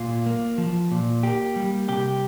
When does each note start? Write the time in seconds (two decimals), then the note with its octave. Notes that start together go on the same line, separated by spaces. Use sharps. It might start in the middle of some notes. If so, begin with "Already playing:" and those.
Already playing: A#2 F4
0.26 A#3
0.58 F3
0.92 A#2
1.23 A#3 G4
1.56 G3
1.89 C3 G4